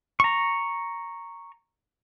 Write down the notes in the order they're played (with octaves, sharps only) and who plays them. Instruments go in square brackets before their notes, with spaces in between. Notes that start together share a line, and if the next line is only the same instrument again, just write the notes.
[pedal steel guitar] A#5 C#6